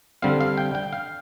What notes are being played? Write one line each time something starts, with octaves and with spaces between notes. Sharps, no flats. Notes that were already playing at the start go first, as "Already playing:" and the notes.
D3 G3 C4 F5
F5
G5
G5
F5